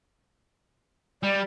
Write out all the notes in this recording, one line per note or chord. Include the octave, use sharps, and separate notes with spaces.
G3 D5